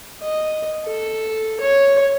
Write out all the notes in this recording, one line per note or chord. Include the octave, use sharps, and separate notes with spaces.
D#5
A4
C#5